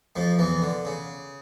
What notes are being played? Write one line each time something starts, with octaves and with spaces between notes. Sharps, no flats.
F2 F3
E2 E3
D3
C#3